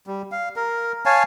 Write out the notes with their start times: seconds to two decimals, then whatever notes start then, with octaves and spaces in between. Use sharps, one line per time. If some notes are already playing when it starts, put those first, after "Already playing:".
0.07 G3
0.32 F5
0.56 A#4
1.05 C#5 F5 G#5 A5